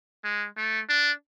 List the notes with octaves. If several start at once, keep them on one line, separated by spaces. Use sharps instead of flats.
G#3
A3
D4